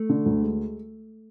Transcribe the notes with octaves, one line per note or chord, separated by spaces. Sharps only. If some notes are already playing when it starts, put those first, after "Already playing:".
Already playing: A3
D3
D2
G#3